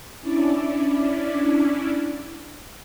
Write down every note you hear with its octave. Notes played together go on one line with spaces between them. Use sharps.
C#4 D4 E4 D5